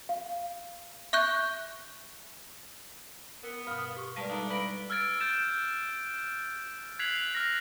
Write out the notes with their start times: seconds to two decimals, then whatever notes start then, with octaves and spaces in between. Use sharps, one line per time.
0.09 F5
1.13 E5 C#6 F#6 G6
3.43 B3 A#4
3.67 G2 B2 F5 F6
3.97 G4 C#6
4.16 G3 G#3 A#3 B4 D5 A5 D#7
4.30 A#2 A3 D4 D#4 F5 A#5
4.50 B4 B5 A#6 D7 F#7
4.90 E6 F6 G#6 A6 D7
5.20 G6 A6 D7 E7
6.99 F#6 G#6 B6 C7 F7 F#7
7.35 F6 A#6